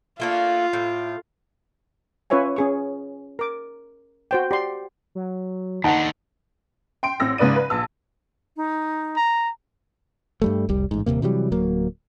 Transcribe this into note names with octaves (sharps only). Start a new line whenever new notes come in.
A3 A#3 D4 F4
A2
C#4 F4 B4 C#5 E5 G#5
C#4 G#4 C#6
A#4 D6
F#4 C5 G5
G4 D5 C6
F#3
D#2 D3 D#4 F#5 A5
G5 C6 D7
A1 C4 E6 A#6
G#2 C#3 B4 D5 D#7
B4
A#1 A5 E6
D#4
A#5
G2 G3 A3
F1 C2 G3
A1 G#2
D#1 G#1 C3 A#3
C3 E3 F#3 G3
D1 F#3 A#3